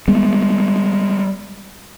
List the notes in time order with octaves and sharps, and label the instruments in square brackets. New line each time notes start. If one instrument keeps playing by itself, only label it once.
[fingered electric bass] G3 G#3 B3